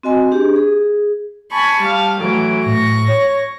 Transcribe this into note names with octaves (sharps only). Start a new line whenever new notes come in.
C4 F#4 D#5 G#5 C6
D4 G4 G#4
G#4
G#5 A5 B5 C#6
G3 F5
A2 E3 F#3 D7
A2 C#6 A#6
C#5